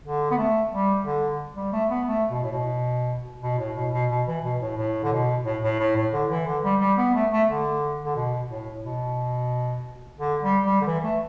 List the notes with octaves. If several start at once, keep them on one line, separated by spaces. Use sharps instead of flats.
D3
B3
A3
G3
D3
G3
A3
B3
A3
B2
A2
B2
B2
A2
B2
B2
B2
E3
B2
A2
A2
D3
B2
A2
A2
A2
A2
D3
E3
D3
G3
G3
B3
A3
A3
D3
D3
B2
A2
B2
D3
G3
G3
D3
E3
A3